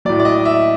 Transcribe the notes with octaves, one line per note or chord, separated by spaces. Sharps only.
A2 F#3 D5
D5
D#5
E5